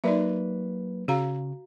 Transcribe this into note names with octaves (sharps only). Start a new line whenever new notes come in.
F#3 A#3 D#4 B4 D5 E5
C#3 F#4 F5 A#5